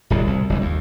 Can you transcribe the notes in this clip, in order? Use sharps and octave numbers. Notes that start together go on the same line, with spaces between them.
D1 C2 B2
C2
F1 C#2 G2
D#2